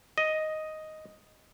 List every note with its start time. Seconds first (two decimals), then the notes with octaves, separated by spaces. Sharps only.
0.18 D#5